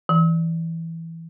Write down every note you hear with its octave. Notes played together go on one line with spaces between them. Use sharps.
E3